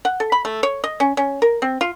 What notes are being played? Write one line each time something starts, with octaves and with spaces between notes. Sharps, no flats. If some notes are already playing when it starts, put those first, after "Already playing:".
F#5
A4
B5
A3
C#5
D#5
C#4
C#4
A#4
C4
F4